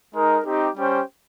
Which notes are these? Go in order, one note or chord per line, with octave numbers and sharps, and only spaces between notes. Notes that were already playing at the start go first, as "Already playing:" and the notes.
G#3 D#4 A#4
C4 D#4 G4
G3 C#4 G4 C5 G5